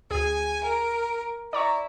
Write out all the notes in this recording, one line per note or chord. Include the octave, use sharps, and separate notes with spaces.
D2 G#4 G#5
A#4
E4 D5 A#5 C#6